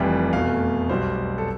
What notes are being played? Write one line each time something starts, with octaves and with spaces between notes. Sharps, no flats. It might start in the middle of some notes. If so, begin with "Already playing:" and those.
Already playing: F1 F2 E3 G3 G5
F1 E2 B2 A3 F5
B1 B2 G3 C5
A4